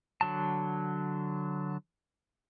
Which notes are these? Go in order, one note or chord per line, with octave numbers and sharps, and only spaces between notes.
D3 F#3 A5